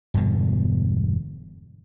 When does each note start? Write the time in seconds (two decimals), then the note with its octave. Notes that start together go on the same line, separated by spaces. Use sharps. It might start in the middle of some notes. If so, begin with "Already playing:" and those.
0.14 E1 G2 B2 D3